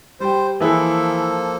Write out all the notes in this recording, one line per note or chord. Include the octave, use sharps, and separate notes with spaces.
G3 C5 G5
E3 F3 A#3 E4 G#4 A4